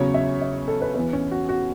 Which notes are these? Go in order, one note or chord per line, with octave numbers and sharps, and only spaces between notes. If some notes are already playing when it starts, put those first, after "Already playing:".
Already playing: E2 C#3 F#3 C#5
E5
E5
A4
B4
E2 E3 B4
C#4
F#4
F#4